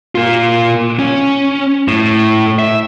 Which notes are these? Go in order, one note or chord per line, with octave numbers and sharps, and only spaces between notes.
A#3 F4
C#4
A2
E5